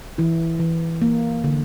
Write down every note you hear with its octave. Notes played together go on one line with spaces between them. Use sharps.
E3 E4
E3
A#3
D3